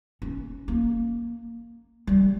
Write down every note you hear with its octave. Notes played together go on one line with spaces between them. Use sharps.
C#4
A#3
G3